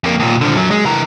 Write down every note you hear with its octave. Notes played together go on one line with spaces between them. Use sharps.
F2 A#3
D#2 A#2
D3 F3
F#2 F#3
G#3
E3 A#4